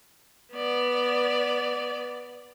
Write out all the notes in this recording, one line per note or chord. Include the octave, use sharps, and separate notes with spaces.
B3 D5